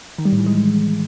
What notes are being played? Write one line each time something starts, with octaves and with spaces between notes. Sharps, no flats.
D#3
G3
A2
E3
G#3